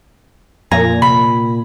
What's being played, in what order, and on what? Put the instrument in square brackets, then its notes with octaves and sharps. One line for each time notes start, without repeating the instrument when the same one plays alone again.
[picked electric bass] F2 F3 [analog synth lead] A#2 [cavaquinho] G#5 A#5
[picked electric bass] C3 [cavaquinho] B5